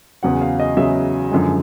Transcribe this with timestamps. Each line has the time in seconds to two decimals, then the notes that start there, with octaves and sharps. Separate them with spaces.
0.23 E2 C#3 F#3 F#5
0.41 F5
0.60 D#5
0.77 E2 C#3 F#3 E5
1.31 F#2 D3 F3 G#3